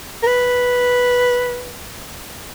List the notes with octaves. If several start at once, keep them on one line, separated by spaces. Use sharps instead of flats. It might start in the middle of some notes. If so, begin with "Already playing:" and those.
A#4
B4